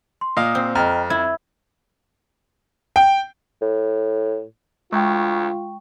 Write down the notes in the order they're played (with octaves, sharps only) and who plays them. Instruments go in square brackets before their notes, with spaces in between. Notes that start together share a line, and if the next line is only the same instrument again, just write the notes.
[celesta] C6
[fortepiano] A#2 D#5 F5 [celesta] D#6
[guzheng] C4
[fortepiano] F2 F6 [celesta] D#5 G5 A#5
[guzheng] E4 [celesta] G#6
[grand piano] G5
[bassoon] A2
[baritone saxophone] D2 [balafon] G#3 [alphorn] F4 [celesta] G5 C#6